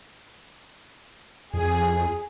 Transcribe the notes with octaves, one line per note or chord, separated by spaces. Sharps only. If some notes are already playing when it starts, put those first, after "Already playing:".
F2 G#4